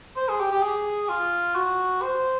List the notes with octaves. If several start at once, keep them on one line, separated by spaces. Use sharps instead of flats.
C5
G#4
G4
G4
G#4
F4
F#4
C5